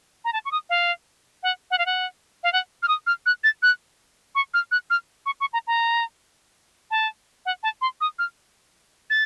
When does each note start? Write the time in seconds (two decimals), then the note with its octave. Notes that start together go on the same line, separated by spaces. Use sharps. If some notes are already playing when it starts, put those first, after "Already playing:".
0.25 A#5
0.33 A5
0.45 C#6
0.51 D#6
0.70 F5
1.43 F#5
1.71 F#5
1.78 F5
1.86 F#5
2.43 F5
2.53 F#5
2.83 F6
2.88 D#6
3.07 F6
3.26 F#6
3.44 A6
3.63 F#6
4.35 C#6
4.54 F6
4.71 F#6
4.90 F6
5.26 C#6
5.41 C#6
5.53 A#5
5.67 A#5
6.91 A5
7.46 F#5
7.63 A5
7.81 C6
8.01 D#6
8.19 F6
9.10 A6